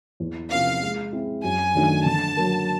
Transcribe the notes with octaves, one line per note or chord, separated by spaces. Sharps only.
E2
C3 F3 A#3 C#4 F5
G#3
C4 E4 G#4
F#2 G#5
D#3 F#3 A3 D4
D3 A5
F#3 A#3